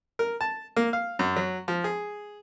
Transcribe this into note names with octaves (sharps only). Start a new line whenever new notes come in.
A#4
A5
A#3
F5
F#2
F#3
F3
G#4